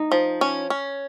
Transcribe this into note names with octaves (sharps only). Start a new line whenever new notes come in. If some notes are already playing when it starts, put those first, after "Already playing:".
Already playing: D#4
F3
C#4
C#4